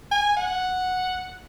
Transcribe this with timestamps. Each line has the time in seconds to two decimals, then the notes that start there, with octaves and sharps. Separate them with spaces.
0.11 G#5
0.37 F#5